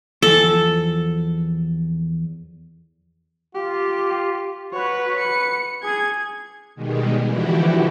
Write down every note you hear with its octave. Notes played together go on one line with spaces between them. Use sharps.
E2 F3 A4 G#5
F4 G4
F#4 B4 C#5
C#7
G#4 G#6
B2 D#3 G3 G#3
D3 E3 F3 E4 F#4 G4